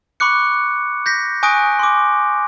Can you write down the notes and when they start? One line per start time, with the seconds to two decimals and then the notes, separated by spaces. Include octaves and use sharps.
0.20 B5 C#6 D6 F#6 C#7
1.06 G6 A#6 B6
1.43 G#5 C#6 D#6 F#6 A#6 D7
1.79 C6 D6